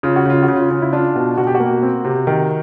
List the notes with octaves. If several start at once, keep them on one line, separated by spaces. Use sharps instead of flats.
C#3 F4
F#4
C#3 F4
F#4
C#3
F4
C#3
E4
D4 F4
B2
B2 F#4
G4
F#4
A#3
C4
C3
D#3